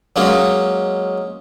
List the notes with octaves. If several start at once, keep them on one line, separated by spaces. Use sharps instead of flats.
F#3 G#3 A#3 C#4 D#4